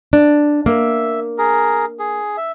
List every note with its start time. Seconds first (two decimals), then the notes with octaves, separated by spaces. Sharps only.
0.13 D4
0.66 A#3 E5
1.38 G#4 A#4
1.99 G#4
2.37 E5